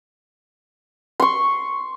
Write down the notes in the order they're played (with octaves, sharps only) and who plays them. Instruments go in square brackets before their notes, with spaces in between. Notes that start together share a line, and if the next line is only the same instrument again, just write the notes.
[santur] C6 C#6